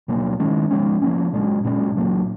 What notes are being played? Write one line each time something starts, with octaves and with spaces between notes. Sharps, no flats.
B2 F#3 A#3
D#3 G#3 C#4
F3 G#3 C#4
F3 A#3 C#4
A#2 G#3 C#4
A#2 G#3 C#4
A#2 F#3 A#3